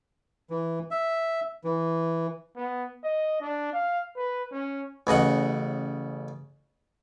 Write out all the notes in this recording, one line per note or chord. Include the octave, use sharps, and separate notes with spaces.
E3
E5
E3
B3
D#5
D4
F5
B4
C#4
A1 C#3 D#5 F#5